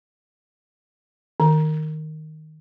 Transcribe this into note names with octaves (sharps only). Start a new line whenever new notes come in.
D#3